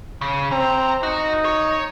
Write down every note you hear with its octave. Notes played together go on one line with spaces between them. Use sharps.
C#3
C4 A#5
D#4 F#4
C#5